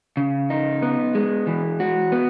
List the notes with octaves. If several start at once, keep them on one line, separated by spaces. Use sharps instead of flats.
C#3
D#4
B3
G#3
E3
F#4
B3